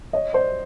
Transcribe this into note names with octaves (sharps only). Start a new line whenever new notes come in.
C#5 D#5
C5 D5